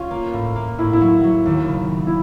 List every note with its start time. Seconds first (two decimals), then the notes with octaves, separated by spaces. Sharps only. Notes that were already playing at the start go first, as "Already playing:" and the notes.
Already playing: C#4 F4
0.11 A#3
0.33 A2
0.56 A#3
0.79 A2 E4
0.93 E4
1.01 F#3
1.24 F#3
1.46 D#2
1.68 C#3
1.91 C#3
2.07 E4